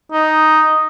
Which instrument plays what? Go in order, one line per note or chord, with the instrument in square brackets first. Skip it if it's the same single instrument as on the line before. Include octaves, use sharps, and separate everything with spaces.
[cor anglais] D#4